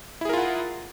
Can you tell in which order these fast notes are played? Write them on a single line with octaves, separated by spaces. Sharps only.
E4 G#4 A#4 F4 F#5